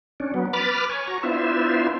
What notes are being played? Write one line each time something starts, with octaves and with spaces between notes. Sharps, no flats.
C#4 D4
F#3 B3
B4 B5 D6 F6 A6
C#5 G#5
F#4 A#5 C#6
B3 D4 E4 F4 C5 E5